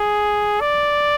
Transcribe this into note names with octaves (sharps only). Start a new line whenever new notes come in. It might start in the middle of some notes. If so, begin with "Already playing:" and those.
Already playing: G#4
D5